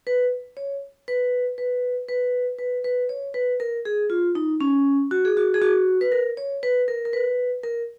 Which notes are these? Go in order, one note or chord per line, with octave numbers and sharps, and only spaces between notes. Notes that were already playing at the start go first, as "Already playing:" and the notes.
B4
C#5
B4
B4
B4
B4
B4
C#5
B4
A#4
G#4
F4
D#4
C#4
F#4
G#4
F#4
G#4
F#4
B4
A#4
C#5
B4
A#4
A#4
B4
A#4